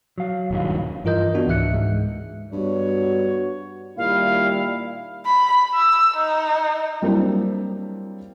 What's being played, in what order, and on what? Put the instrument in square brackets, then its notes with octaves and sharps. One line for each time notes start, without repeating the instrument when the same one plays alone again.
[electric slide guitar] F#3 F5
[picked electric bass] D#1 G2
[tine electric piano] G2 E3 F4 A#4 D#5 G6
B3 D4 F#4
C#2 G#2 E3 E5 F#6 C#7
G#2 G#3
[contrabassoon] G2 [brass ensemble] B3 F#4 C#5
[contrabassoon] A#2 [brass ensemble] D#3 G3 E4 [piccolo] F5
[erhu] B5
E6
D#4
[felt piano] F#3 G3 A#3 C4 D4 E4